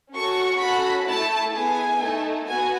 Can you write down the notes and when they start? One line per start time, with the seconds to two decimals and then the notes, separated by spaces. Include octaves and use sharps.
0.12 C#4 F#4 A4 C#6
0.59 C#4 F#4 A4 B5
1.06 A3 E4 A4 A5
1.52 B3 E4 G#4 G#5
1.99 A3 D#4 A4
2.47 B3 F#4 G#5